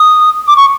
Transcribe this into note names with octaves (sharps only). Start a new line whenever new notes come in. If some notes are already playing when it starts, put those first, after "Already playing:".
Already playing: D#6
D6
C#6